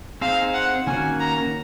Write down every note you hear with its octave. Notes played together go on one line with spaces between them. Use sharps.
C4 D#4 G#4 C5 F5
F#5
D#3 A#3 C#4 F#4 G#5
A#5